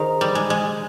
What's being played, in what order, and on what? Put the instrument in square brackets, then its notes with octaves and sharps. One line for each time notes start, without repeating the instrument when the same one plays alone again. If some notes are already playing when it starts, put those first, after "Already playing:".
Already playing: [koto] D#3 [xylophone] G#4 C5 D#5 A#5
[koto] G3
G#3
G#3